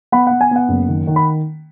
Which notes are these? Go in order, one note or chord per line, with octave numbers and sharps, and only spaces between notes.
B3 F#5 B5
B3 F#5
G#5
B3 F#5
F#1
D#3
D#3
B5